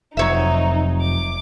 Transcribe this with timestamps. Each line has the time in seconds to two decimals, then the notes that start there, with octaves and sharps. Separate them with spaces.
0.17 F1 F#3 D#4 C#5 E5
1.01 D6